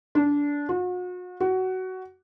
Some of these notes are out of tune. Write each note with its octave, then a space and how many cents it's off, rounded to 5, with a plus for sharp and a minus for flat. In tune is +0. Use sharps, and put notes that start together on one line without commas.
D4 -20
F#4 -40
F#4 +15